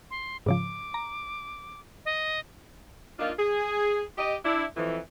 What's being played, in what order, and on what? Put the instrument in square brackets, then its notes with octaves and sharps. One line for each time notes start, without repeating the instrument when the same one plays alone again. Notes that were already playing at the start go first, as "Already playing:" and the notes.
[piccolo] C6
[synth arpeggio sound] G#2 C#3 F3 [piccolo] D6
[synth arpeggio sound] A#5
[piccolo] D#5
[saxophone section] A#3 D4 D#4 F4
G#4
G4 D#5
D4 E4
F2 E3